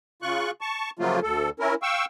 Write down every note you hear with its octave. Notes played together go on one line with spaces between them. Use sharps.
C#3 F4 C#6 F#6
A5 C#6
C#3 F3 F#3 A3 A#3 F4
D2 A4
C#4 E4 A#4
F5 G5 C#6 E6